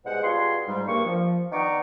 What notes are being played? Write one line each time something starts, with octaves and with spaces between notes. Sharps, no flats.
C2 B2 G#3 C5 F#5
B2 G3 F4 G#4 C6
G#2 G3
G2 A#3 C#6
F3
D#3 B3 D4 D#4 C#6 D6